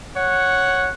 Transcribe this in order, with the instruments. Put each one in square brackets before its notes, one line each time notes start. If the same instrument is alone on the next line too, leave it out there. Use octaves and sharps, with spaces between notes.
[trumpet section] C#5 F#5